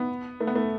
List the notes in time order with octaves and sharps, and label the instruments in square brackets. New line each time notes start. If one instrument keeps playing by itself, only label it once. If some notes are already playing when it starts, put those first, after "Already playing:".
Already playing: [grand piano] B3
A3
B3
A3